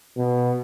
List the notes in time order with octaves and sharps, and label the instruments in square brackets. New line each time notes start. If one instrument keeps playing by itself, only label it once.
[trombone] B2